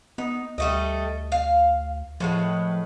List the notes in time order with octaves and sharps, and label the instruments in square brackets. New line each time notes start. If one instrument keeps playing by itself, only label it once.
[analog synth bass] B3 [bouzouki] D#4
[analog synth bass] D2 [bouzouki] G3 A3 D#5
[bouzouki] F5
[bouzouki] A2 G#3 B3 [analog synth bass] F3